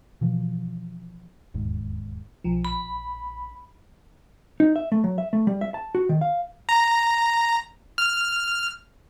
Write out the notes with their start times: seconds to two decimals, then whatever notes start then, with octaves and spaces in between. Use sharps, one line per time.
0.21 B2 E3 F3
1.54 E1 D#2 G#2
2.44 B1 F3
2.65 A#1 B5
4.60 D#4
4.76 E5
4.92 A3
5.04 F#3
5.18 E5
5.33 A3
5.47 G3
5.61 E5
5.74 A5
5.95 F#4
6.09 D#3
6.21 F5
6.69 A#5
7.98 F6